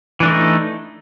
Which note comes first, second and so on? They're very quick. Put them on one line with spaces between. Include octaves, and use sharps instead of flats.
E3 D4 A3 D#4